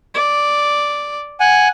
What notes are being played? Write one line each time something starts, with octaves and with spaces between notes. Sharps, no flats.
D5
F#5 G#5